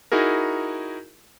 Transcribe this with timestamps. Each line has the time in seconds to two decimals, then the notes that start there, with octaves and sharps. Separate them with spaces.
0.12 D#4 E4 F#4 G#4 A#4